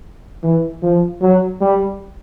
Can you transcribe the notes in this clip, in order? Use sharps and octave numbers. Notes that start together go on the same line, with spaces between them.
E3
F3
F#3
G3